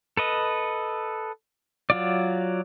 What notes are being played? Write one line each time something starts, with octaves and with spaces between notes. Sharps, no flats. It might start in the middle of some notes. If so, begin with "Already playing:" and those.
A4 B4 D#5
F#3 F4 D5